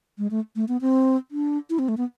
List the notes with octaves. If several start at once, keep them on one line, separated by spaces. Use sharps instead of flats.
G#3
A3
A3
B3
C4
D4
E4
C4
A3
B3